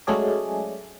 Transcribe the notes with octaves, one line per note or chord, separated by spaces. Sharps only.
F#3 G#3 A3 C#4 G#4 D5